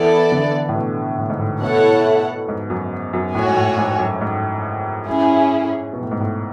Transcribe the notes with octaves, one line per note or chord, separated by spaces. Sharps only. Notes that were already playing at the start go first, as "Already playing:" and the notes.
Already playing: E3 B3 E4 A4 D5
D3
A2
B2
A2
G#2
A2
B2 A3 E4 A4 C#5 F#5
G#2
F#2
F#2
A2 F#4 C#5 G#5
G#2
A2
G#2
F#2
G#2
G#2 C#4 E4 G#4
B2
A2
G#2
A2